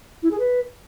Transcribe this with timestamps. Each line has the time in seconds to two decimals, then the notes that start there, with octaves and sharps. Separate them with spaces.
0.23 E4
0.31 G#4
0.39 B4